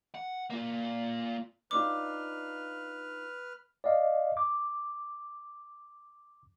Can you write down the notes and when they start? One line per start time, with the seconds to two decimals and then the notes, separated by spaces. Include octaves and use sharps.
0.14 F#5
0.50 A#3 F4
1.71 D4 D#4 F4 B4 D6 F6
3.84 D5 D#5 F5
4.37 D6